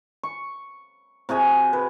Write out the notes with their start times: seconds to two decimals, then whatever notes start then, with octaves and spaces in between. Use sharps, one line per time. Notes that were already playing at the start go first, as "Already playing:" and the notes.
0.23 C#6
1.29 C3 F#4 G#4 G#5
1.73 B4